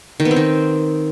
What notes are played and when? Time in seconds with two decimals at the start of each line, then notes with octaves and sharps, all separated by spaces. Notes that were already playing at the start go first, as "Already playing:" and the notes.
0.20 D#3
0.25 B3
0.31 C4
0.36 D#3